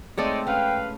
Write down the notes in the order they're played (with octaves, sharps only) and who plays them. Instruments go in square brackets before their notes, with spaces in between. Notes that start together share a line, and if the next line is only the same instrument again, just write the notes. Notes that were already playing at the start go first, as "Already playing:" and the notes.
[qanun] G#3 A3 C4 [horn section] D#4 C#5 D5
[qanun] C#4 [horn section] B4 F5 [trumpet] G5